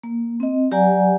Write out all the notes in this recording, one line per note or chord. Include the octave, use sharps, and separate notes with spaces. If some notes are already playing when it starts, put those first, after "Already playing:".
A#3
C4 D#5
F#3 G4 D5 F#5 G#5 A#5